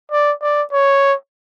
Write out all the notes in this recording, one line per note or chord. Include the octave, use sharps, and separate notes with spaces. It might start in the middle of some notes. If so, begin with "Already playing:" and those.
D5
D5
C#5